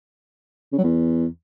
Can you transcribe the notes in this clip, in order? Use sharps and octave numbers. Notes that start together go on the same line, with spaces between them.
C#3
F#3
E2